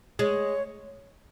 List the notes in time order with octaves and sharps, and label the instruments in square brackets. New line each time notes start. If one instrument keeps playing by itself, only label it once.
[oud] G#3 [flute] C#5